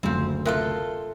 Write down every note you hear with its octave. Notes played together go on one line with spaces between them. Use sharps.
F#1 D2 F3 C4
C3 F4 A4 A#4 G5 F#6